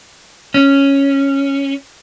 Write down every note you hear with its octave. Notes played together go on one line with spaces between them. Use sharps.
C#4